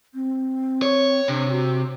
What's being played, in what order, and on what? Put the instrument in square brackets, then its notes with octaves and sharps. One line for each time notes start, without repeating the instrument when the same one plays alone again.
[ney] C4
[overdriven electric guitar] C#5
[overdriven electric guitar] C3 [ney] D4
[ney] F#4